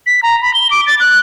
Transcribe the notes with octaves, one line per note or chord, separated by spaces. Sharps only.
B6
A#5
B5
G7
D6
A6
F#6